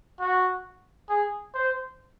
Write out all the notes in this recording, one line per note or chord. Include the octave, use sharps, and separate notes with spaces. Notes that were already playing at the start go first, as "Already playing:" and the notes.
F#4
G#4
C5